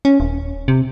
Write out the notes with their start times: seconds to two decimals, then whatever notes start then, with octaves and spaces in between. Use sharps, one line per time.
0.05 C#4
0.20 D#1
0.68 C3